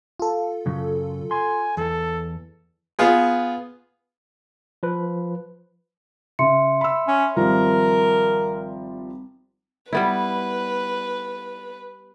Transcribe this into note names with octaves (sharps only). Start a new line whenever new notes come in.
F4 A4
F#2 C#3 F#3
G#5 C6
E2 A4
B3 F4 G#4
F3 B4
C#3 E5 C6 C#7
B5 E6
C#4
G#1 F3 G3 A#4
G3 B3 E4 B4